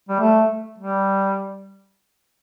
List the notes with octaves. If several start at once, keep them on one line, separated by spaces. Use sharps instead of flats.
G3
A3
G3